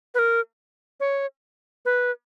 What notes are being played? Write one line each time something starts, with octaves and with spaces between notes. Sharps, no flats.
B4
A#4
C#5
B4